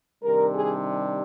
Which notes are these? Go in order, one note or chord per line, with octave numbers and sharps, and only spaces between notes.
C3 D#3 G3 D4 A#4
G#4